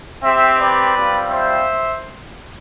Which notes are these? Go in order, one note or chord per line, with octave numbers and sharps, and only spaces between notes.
C4 G4 C5 E5
B4 D5
G3 C4 F4
C5 E5